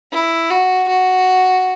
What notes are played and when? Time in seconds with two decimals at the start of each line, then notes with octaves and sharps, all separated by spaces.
0.12 E4
0.50 F#4
0.89 F#4